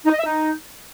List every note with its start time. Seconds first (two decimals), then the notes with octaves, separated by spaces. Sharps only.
0.05 D#4
0.12 D#5
0.19 E5
0.25 D#4